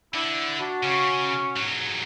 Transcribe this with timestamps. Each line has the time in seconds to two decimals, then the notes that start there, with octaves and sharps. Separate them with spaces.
0.14 D3 E4 D5
0.60 D4 F#4
0.83 C#3 C#4
1.56 G#2 F#3